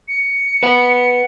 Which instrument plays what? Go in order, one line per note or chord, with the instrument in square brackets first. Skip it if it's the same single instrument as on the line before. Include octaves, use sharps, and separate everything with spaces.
[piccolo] C#7
[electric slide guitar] B4 F#5